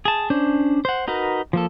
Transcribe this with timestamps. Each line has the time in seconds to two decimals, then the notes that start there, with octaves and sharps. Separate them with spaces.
0.05 G#4 A5
0.30 C#4 D4 C5
0.85 C5 F#5
1.08 D#4 F#4 A#4 B4
1.53 F3 A#3 A4